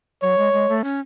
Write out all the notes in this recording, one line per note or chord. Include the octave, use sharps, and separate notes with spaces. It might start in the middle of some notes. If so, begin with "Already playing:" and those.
F#3 C#5
G#3
G#3
A3
C#4